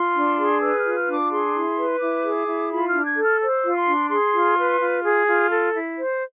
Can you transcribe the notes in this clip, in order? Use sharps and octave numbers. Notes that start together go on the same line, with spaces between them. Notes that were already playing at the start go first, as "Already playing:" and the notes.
Already playing: F4 C6
D4
G#4
B4 E6
F6
F4
F6
D4
D6
G#4 C6
E4
B4
E4 D6
G#4
E4
F4 B5
F6
D4
G#6
A4
F6
C5 E6
F4
C6
D4
G#4 C6
F4
B4
F4
G#4
F4
A4
E4
C5